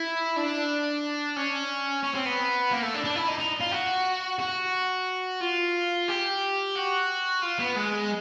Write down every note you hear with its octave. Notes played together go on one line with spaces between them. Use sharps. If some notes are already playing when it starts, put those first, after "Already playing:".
Already playing: E4
D4
C#4
C#4
C4
B3
A#3
A3
D4
D4
E4
D#4
D#4
F4
F#4
F#4
F4
G4
F#4
F4
B3
G#3